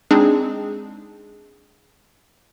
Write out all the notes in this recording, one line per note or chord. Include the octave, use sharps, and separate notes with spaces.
G#3 C4 D4 D#4 G#4